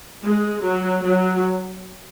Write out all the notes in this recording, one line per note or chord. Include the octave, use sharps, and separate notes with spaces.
G#3
F#3
F#3